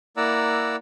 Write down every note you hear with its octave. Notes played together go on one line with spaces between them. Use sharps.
A#3 E4 D5 F#5 A#5 E6